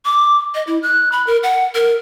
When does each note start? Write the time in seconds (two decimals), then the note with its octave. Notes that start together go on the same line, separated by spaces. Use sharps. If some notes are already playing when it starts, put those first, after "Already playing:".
0.05 D6
0.55 D#5
0.67 E4
0.83 F#6
1.12 B5
1.27 A#4
1.43 F#5
1.75 A#4